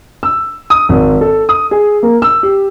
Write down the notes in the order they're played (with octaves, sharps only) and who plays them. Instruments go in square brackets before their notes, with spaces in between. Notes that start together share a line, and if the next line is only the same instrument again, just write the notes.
[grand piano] E6
D#6
G#1
A4
D#6
G#4
A#3
E6
G4